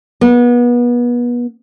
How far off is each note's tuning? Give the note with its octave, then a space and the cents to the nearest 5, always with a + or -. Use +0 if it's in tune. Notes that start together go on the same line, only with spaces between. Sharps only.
B3 -30